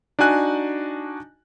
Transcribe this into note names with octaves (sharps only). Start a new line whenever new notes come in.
D4 D#4 F#4 G#5 F#6